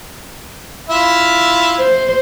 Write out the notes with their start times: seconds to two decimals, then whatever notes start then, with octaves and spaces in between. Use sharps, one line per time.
0.89 E4 F4 E5
1.80 C5